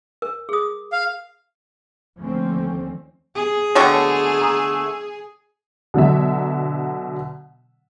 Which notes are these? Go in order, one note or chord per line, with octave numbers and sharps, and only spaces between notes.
A#4
G#4 D#6
F5
D#2 D3 F3 A3 C4 C#4
G#4
B2 D3 A3 C#5 G5 C#6
A#5 D#6
B2 D3 F#3 E5